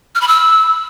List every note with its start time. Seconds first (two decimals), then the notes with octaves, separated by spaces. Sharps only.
0.15 F6
0.21 B5
0.28 E6